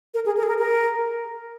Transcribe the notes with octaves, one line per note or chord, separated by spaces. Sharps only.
A#4
G#4
A#4
G#4
A#4
A#4